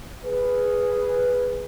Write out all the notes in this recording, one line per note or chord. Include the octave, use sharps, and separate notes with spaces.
G#4 B4